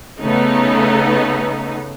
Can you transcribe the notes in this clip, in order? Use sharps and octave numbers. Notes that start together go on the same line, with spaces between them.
C#3 A3 B3 D#4